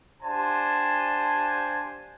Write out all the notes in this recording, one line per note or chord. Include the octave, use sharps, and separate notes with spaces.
D4 F4 G4 C5 G#5 A5